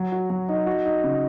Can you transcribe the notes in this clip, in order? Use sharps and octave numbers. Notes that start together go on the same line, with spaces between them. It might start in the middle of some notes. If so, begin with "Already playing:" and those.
Already playing: F#3
F#4
F#3
D#4
F#4
D#4
C#3